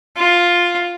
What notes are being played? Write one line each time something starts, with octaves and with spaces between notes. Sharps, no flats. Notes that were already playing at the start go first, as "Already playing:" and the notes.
F4